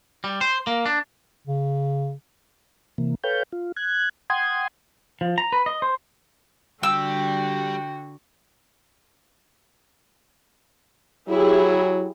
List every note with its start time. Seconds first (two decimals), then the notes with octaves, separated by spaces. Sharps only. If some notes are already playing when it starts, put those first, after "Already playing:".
0.24 G3
0.41 C5
0.67 A#3
0.86 D4
1.47 C#3
2.98 C3 E3 A#3
3.24 A4 B4 C#5 F5 G5 G6
3.52 F4
3.76 F#6 G#6
4.30 F#5 G5 C6 D#6 G#6
5.21 F3
5.38 A#5
5.52 B4
5.66 D#5
5.82 C5
6.83 D3 G3 F#4 G4 G5 E6
11.29 F#3 E4 G4 G#4